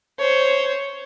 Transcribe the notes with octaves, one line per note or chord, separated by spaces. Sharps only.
C5 C#5